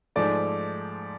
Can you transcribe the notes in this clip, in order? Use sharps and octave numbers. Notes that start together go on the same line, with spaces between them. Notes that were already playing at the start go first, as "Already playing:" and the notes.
G#2 F3 A3 D5